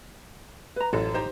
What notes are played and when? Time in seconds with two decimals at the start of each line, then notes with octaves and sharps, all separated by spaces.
0.76 B4 A#5
0.93 A1 F#2 F3 F#4 A4
1.14 D#4 G4 C5 A#5